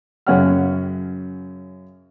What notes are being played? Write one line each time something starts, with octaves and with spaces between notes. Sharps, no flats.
F#2 C#3 C#5 F#5 F6